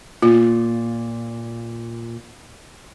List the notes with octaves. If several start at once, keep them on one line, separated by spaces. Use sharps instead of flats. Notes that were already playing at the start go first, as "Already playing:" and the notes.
A#2 F4